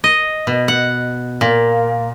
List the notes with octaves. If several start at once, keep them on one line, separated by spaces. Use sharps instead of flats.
D#5
B2
F#5
A#2